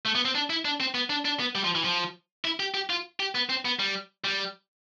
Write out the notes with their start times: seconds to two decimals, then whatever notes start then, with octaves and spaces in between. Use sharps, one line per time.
0.05 A3
0.15 B3
0.25 C4
0.35 D4
0.50 E4
0.65 D4
0.80 C4
0.95 B3
1.10 D4
1.25 D4
1.40 B3
1.55 G3
1.64 F3
1.75 E3
1.84 F3
2.45 E4
2.60 G4
2.74 G4
2.90 F4
3.20 G4
3.35 B3
3.50 C4
3.65 B3
3.79 G3
4.24 G3